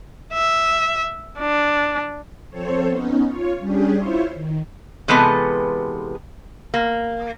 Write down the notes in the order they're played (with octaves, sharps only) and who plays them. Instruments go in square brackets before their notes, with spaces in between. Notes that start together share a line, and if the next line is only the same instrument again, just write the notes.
[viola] E5
D4
[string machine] F3 C4 A4 C5 C#5
B3 C#4 D#4
F4 C#5
G3 C#4 D4 G4 G#4
E4 F4 C5 C#5
D#3
[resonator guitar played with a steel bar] C3 E3 G#3 B3 A4
A#3